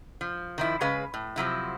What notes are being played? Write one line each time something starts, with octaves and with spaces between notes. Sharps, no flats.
F3
D#3 F3 E4
C#3 G#3 C#4 B4 F5
A2
C3 F3 F#3 E4